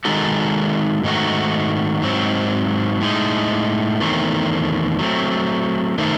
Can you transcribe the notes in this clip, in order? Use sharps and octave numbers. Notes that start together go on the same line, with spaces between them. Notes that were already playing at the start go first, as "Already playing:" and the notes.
D#3 G#3 D#4 F#4 A4
G#2 D#3 A3 D#4 F#4
G#2 F#3 C4
A2 G#3 D#4
E2 D#3 A3 C4
F#3 A3 C4
D#3 A3 D#4 A4 C5